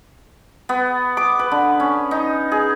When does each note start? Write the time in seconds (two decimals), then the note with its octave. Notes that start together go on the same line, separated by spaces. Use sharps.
0.69 B3
1.17 D6
1.39 B4
1.51 D3
1.80 C#4
2.11 D#4
2.52 G#4